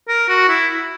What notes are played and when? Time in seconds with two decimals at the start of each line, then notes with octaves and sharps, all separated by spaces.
0.08 A#4
0.29 F#4
0.49 E4